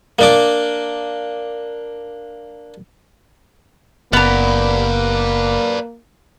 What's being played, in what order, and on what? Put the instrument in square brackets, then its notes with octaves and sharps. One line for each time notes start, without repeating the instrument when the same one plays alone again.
[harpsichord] A#3 D4 D6
[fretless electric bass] F#1 [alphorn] A#3 [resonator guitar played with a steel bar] B3 A#5 [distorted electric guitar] B4 D5